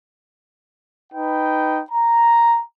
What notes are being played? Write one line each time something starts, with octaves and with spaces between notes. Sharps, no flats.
D#4 B4 G5
A#5